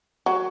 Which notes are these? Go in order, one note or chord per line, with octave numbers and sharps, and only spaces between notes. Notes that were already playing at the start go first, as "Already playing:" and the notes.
F#3